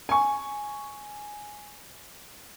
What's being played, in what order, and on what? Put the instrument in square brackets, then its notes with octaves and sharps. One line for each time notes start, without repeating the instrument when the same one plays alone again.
[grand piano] G#5 C#6